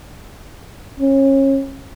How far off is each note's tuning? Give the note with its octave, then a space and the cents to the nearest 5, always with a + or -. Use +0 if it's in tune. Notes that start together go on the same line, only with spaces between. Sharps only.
C#4 -30